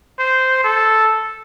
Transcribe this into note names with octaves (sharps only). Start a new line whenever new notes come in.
C5
A4